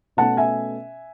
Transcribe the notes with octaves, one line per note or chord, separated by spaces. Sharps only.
B2 A3 C#4 F#5 A5
E5 G#5